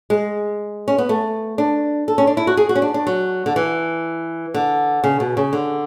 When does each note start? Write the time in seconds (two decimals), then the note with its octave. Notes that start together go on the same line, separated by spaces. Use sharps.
0.10 G#3
0.88 C#4
0.98 B3
1.09 A3
1.58 D4
2.08 A4
2.18 C#4
2.27 D4
2.37 E4
2.47 F#4
2.57 G#4
2.69 F#4
2.76 C#4
2.82 D4
2.94 D4
3.07 F#3
3.46 D3
3.56 E3
4.54 D3
5.04 C#3
5.20 B2
5.37 C#3
5.53 D3